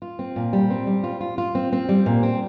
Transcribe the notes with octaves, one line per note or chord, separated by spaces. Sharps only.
F4
C4
A#2
G3
C4
G3
F4
F4
F4
C4
C4
G3
A#2
C4